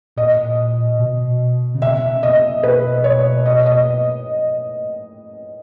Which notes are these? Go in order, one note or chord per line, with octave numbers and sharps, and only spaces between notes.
A#2 D#5
B2
C#3
B2 E5
C#3
B2 D#5
B2 B4
C#5
D#5
D#5